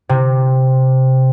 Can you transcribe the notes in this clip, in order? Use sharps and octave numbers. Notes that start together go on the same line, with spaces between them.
C3